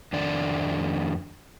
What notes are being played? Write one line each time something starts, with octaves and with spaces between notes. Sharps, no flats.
F2 D#3 D4 D5